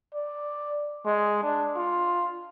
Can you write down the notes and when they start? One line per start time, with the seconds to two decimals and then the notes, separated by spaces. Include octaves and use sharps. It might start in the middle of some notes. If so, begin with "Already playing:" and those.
0.14 D5
1.05 G#3
1.43 D4
1.76 F4